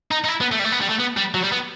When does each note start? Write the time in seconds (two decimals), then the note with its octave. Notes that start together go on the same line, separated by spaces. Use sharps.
0.11 D#4
0.24 D#4
0.28 E4
0.41 B3
0.52 A3
0.59 G3
0.65 A3
0.72 B3
0.82 G3
0.90 A3
1.00 B3
1.17 G3
1.34 F#3
1.43 G3
1.52 B3